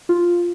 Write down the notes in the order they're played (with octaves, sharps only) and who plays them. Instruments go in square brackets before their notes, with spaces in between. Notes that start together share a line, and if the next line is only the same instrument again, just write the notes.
[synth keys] F4